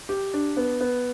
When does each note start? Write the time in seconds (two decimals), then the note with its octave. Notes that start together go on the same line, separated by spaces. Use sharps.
0.09 G4
0.34 D4
0.57 B3
0.81 B3